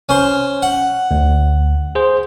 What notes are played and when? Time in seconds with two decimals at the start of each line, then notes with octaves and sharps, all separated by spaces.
0.09 C#4 C5
0.62 F#5
1.11 D2
1.95 G#4 C5